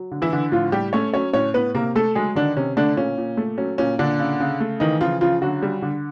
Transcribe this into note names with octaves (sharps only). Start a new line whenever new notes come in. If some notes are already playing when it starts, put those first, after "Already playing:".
Already playing: F#3
D3
E3 E4
D3
A2 F3 F4
A2 G3 G4
A3 C#4 C#5
F#3 C#4 C#5
A2 C#4 C#5
A2 B3 B4
C3 A#3 A#4
A3 A4
F#3 G#3 G#4
D3 D#3 D4
C3 C#4
D3 A3 D4
A#2 C#4
A#2
A3
F#3 C#4
A#2 C#4
A#2 D3 D4
C#3
C#3
A3
D#3 E3 D#4
C#3 F3 F4
C#3 F3 F4
D3 F#3 F#4
G3
D3